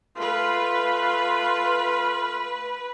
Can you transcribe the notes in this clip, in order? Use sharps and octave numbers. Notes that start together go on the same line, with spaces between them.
A3 F4 B4